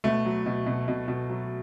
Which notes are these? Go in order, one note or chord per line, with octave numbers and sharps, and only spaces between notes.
B2 A3
F#3
B2
B2
B2
B2
F#3